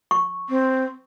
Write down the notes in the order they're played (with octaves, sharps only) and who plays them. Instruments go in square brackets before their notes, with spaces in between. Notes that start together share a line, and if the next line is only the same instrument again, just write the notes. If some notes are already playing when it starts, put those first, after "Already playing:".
[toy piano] C#6
[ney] C4